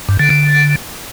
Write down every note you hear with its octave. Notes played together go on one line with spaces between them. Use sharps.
G2
D3
D3